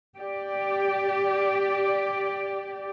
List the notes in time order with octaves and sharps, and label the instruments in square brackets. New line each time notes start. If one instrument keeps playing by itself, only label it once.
[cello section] G4 D5